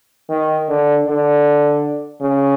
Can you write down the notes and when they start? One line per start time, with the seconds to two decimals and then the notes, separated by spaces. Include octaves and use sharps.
0.30 D#3
0.69 D3
1.07 D3
2.21 C#3